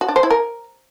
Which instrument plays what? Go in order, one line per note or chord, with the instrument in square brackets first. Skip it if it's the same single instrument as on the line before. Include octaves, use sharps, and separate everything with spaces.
[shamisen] F#4
D4
C5
E4
A#4